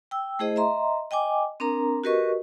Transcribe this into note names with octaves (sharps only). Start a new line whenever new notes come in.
G5 E6
A3 E4 G#4 C5 D#5
D#5 E5 A#5 C6
D#5 G5 G#5 D6
C4 D4 A#4 A#5
F#4 G4 A#4 B4 D#5 C#6